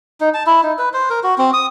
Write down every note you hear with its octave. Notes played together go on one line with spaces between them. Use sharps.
D#4
A5
E4
D#4
B4
C5
A#4
F#4
C4
D#6